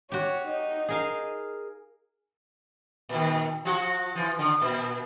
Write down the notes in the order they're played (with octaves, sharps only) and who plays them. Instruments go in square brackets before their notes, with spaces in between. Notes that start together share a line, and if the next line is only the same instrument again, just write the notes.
[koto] F#4 G4 [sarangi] C#5
[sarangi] D#4
[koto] G#4 A#4 F5
[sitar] A#2 D#3
F3 F#4
E3 F3
D3
A#2